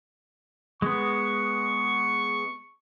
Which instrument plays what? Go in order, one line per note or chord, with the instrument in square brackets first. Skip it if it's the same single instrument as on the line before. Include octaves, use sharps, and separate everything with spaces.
[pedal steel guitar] G#3 B3 [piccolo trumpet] C#6